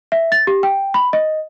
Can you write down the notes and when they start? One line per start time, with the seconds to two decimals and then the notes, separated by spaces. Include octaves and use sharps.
0.12 E5
0.32 A6
0.47 G4
0.63 G5
0.94 B5
1.13 D#5